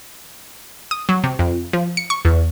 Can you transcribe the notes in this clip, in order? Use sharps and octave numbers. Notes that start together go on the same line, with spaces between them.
D#6
F#3
C3
F2
F3
C#7
C#6
E2